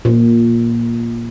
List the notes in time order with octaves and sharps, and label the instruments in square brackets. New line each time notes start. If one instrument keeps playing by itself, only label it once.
[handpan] A#2